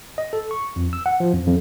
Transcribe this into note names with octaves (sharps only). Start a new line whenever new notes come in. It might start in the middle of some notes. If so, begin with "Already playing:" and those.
D#5
A4
C#6
F2
E6
F#5
F3
F2
F2